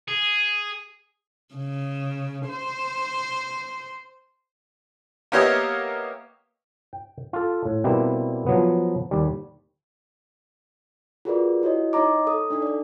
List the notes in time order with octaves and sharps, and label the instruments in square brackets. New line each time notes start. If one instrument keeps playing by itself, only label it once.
[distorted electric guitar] G#4
[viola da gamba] C#3
C5
[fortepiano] A#3 B3 G4 C#5 D#5 E5
[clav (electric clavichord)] G5
F4 A4
A2
B2 G3 A#3 C4 E4
F3 F#3 B3
D#2 G3
[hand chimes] F4 F#4 G#4 A#4 B4 D5
E4 F#4 C#5 D#5
D#4 C#5 D#5 A#5 D6
A4 D#6
D4 D#4 A4
A4 D5